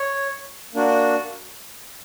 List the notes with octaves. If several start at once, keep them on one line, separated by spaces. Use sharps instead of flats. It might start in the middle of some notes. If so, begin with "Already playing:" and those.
Already playing: C#5
A#3 D4 F#4